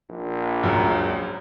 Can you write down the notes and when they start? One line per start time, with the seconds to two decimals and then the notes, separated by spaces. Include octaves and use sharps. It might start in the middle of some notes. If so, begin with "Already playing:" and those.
0.10 A#1
0.63 C#2 F#2